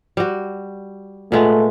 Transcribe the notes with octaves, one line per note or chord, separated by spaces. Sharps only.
G3 F#4
A#2 G#3 A3 B3